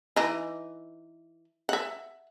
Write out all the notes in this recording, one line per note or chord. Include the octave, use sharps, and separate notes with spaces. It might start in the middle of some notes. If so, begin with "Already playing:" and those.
E3 D#4
E5 F#5